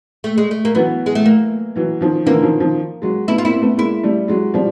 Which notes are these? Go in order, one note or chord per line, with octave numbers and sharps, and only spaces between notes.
A3
G#3
A3
A#3
E3 F#3 B3
G#3
A3
A#3
E3 F#3
D#3 F3
D3 E3 A#3
D#3 F3
D#3 F3
F#3 G#3
A3 B3 E4
F4
A#3 C4 E4
A3 B3
G#3 A#3 E4
G3 A3
F#3 G#3
F3 G3